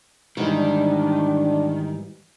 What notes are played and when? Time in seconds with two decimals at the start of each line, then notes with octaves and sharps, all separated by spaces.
0.37 G#2 D#3 E3 G3 D4